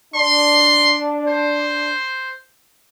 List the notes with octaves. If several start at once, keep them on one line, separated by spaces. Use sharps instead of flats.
D4 C6
C5